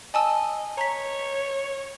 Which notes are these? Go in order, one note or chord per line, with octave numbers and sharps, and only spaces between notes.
D#5 G#5 A5 E6
C#5 A#5 B6